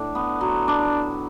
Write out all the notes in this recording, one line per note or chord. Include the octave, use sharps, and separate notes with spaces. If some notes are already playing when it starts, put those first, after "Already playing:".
Already playing: A2 D4
B3
F#3
D4